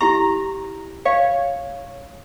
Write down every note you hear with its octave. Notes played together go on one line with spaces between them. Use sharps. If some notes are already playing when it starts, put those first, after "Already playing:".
E4 G4 A#5 C#6
C#5 F5